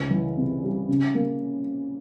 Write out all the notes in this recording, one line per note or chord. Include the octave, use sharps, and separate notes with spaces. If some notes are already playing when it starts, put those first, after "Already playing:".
Already playing: C#2 C#4
E3
C3
G3
C#3
A#3